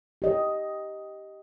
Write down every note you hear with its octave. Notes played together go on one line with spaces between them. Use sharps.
G4 D#5